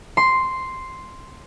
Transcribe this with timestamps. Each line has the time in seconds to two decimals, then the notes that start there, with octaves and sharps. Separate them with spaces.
0.17 C6